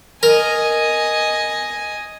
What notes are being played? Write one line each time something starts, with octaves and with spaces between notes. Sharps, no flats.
A#4 D#5 G#5